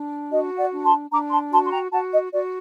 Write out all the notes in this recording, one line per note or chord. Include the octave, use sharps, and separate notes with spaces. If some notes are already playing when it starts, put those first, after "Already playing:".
Already playing: D4
F#4 D#5
D5 F#5
D4
A5 C6
D4 A#5 D6
A5 C6
F#4 A5 C6
C6
G5 A#5
F#4 F#5 A5
D#5
F#4 D5